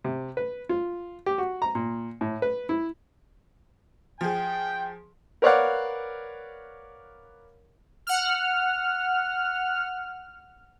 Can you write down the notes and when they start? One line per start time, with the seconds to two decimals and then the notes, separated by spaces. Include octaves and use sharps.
0.04 C3
0.37 B4
0.69 F4
1.26 G4
1.38 F#4
1.62 A#5
1.75 A#2
2.21 A2
2.42 B4
2.69 E4
4.21 F3 G#4 G5
5.42 A#4 B4 C#5 D5 F5 F#5
8.07 F#5 F6